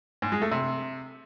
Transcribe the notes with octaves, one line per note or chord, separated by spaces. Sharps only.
G#2
G#3
A3
C3